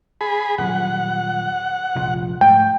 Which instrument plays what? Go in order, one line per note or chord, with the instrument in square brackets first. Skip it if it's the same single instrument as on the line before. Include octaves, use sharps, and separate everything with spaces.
[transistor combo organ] G#4 B5
[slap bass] D#1 F#3 [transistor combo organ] F#5
[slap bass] F1 A#1 F3
[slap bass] G#2 A3 [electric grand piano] G5